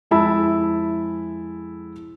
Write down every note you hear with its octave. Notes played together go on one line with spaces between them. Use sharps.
F2 G#3 E4 A5 B5 E6